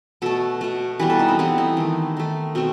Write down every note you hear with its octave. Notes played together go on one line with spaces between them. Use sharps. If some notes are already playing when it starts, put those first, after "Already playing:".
B2 A3 A4
B2 A3
E3 G3 B3 B4
A4
D#4
C4
E3 G3 B3 C4
D#4
D#3 A3
D#3 A3
B2 A3 C4